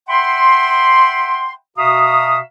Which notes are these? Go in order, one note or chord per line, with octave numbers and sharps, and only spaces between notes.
E5 F#5 G5 B5 C6
B2 F#4 E5 F5 A#5 D#6